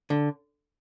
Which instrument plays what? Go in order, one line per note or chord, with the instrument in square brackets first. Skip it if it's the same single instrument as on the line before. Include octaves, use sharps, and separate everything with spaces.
[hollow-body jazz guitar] D3